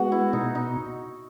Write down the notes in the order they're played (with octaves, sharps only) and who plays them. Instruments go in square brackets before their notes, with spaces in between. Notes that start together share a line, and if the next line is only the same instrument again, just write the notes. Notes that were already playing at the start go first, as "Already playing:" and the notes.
Already playing: [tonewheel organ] G#3 B3 [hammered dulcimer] F#4
[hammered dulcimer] E4
[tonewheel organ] B2 [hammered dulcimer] D#4
[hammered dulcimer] D#4